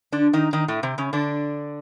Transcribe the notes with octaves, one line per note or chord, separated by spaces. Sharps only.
D3 D4
D#3 D#4
D#3 D#4
A2 A3
C3 C4
C#3 C#4
D3 D4